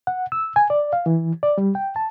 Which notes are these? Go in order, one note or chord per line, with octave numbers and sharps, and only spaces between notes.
F#5
E6
G#5
D5
F5
E3
D5
G3
G5
A5